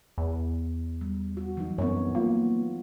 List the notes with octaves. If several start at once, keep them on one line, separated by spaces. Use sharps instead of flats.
E2
G3
F#4
E3 F#3 D#4
F#2 B3 C4 C#5
A#3 F4